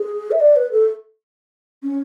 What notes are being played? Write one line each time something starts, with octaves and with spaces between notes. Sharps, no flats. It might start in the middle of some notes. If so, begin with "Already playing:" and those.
Already playing: G#4
E5
D5
B4
A4
C#4